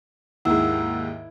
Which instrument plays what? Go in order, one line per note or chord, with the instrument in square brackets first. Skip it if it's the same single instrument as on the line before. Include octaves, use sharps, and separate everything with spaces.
[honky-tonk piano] D#2 G#2 [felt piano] E4 [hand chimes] F#5 E6